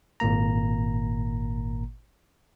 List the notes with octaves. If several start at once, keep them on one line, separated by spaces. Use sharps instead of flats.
G#1 A#2 A#3 A#5